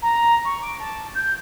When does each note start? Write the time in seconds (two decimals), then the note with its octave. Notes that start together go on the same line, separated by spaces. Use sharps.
0.02 A#5
0.44 C#6
0.61 D6
0.79 A5
1.15 G6